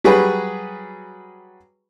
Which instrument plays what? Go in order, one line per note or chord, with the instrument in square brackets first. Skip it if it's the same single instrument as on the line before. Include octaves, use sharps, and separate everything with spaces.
[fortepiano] F#3 G3 F#4 G#4 B4